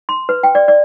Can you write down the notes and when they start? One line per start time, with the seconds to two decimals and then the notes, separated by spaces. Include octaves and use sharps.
0.09 C6
0.29 B4
0.43 G5
0.55 D5
0.68 D5